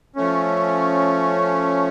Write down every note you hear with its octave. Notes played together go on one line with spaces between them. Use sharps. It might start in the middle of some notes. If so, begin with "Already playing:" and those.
F3 A3 C#4